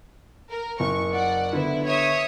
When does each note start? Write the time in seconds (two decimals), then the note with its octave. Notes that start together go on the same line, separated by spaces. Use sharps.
0.50 A#4
0.80 F#1 C#6
1.12 D5 F#5
1.53 D3 B3 E4
1.86 C#5 E5 D#6